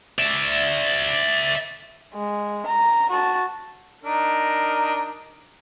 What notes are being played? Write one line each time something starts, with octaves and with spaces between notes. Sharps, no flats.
D5 E5
G#3
A#5
F#4 A5
D4 D#4 A#4